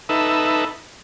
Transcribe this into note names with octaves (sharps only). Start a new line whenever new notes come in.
D#4 A4 B4 E5